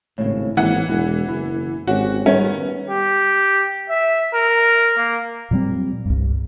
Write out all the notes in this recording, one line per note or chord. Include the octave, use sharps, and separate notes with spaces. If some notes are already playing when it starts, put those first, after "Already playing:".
G#1 A2 C#3
G#1 E3 A#3 F#5
E1 E4
F#1 E4
G#1 C#4 F#4 G4
D#3 G3 B3 C#4
G4
E5
A#4
A#3
A#2 F#3 G3 C4
C2 G2